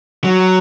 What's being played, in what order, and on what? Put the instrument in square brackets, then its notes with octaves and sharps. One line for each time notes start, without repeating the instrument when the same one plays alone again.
[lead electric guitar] F#3